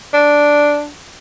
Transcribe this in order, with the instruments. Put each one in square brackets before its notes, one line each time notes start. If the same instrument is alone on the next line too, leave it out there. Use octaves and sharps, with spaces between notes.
[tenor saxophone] D4